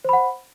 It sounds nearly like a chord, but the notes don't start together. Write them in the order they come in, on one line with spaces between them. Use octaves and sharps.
C5 B5 F#5